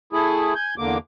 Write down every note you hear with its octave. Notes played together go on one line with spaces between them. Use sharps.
A3 E4 G#4
G#5 G6
E2 D3 A#3 D6